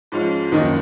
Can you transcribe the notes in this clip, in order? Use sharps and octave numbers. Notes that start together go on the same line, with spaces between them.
G#2 F3 G#3 C#4 F4
F#1 F#2 D#3 F3 A#3 D#4